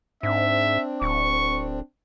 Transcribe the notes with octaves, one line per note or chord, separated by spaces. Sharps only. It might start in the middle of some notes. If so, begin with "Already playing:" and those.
G#2 C4 D4 E5
D1 C#6